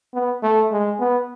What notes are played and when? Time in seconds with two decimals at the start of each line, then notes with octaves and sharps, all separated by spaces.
0.14 B3
0.43 A3
0.72 G#3
1.00 B3